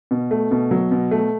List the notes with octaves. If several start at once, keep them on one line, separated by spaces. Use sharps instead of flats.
B2
A3
B2
F#3
B2
A3